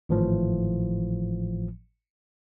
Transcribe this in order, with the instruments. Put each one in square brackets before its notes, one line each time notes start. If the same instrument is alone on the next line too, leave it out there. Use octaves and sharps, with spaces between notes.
[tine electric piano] G#1 A2 E3 F3